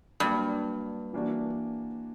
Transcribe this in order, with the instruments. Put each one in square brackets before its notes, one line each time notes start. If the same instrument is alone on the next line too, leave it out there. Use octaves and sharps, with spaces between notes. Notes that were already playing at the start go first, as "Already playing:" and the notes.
[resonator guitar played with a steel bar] G2 [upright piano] F#3 A#3 D4
[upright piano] E3 A#3 D4 F#4